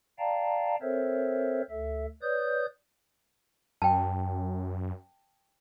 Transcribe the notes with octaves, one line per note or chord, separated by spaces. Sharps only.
D5 F5 G5 A5 A#5
C4 A4 A#4 C5 C#5 E5
D2 A4 E5
B4 C#5 D5 D#6 G6
F#2 G5 A5